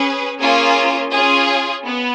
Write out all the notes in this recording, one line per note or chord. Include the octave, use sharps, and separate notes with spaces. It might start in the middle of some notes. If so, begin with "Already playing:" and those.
Already playing: C#4 G#4 B4
A#3 C#4 F4 G#4
C#4 F4 G#4
B3